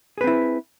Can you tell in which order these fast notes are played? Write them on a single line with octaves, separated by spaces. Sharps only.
G#4 B4 C4 E4